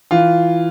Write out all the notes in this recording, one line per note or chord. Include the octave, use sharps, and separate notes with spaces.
E3 F4